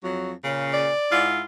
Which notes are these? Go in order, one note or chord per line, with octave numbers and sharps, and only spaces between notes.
F2 F#3
A#2 C#3
D5
G#2 E4 F4